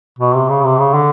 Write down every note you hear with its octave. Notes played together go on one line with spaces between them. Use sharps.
B2
C3
C#3
C3
C#3
D3